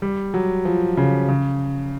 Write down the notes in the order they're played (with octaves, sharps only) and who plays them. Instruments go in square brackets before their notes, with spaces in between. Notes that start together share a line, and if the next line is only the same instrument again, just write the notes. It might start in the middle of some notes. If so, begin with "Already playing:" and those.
[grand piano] G3
F#3
F3
C#3
C#3